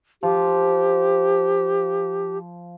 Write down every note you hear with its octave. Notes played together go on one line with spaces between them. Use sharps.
F3 G4